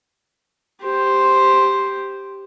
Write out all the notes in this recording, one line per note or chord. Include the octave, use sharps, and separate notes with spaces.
G4 C5